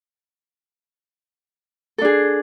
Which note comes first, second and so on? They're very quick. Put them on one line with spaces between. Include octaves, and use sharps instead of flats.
A4 D4 G#4